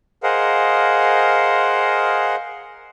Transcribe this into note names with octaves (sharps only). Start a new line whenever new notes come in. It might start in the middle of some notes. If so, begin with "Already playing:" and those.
G#4 A#4 C5 D#5 F5 F#5